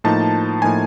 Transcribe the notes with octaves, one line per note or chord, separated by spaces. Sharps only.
A2 F3 A#3 D#4 A5
A2 F3 A#3 D#4 G#5